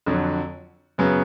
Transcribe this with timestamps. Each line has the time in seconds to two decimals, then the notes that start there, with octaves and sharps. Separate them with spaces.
0.06 F2 D3 F#3
0.98 F#2 C#3 F#3 B3